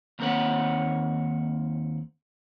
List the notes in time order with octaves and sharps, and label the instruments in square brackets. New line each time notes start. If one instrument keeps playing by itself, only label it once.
[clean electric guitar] D#2 A#3 C4 A#4 C#5 F#5